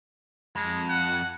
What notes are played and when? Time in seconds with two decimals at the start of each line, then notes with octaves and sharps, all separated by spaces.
0.56 F2 G#3
0.89 F#5